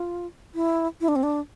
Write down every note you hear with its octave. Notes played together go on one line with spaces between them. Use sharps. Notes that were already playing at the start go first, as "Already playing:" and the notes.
Already playing: F4
E4
E4
D4
C4
D4